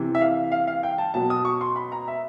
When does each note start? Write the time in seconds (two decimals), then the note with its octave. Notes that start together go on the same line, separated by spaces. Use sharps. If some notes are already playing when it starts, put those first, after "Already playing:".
Already playing: C3 E3
0.15 E5
0.21 F5
0.52 F5
0.67 F5
0.83 G5
0.98 A5
1.14 B2 F#3 A5
1.30 D#6
1.45 C#6
1.61 C6
1.76 B5
1.92 A#5
2.08 E5